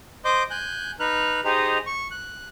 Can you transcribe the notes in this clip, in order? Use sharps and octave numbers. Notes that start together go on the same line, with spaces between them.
C5 D#5 C6 D6 G6
G#5 F#6 G6
D#4 B4 F6 F#6
D#4 G4 G#4 C5 D#5 A#5
C#6
F#6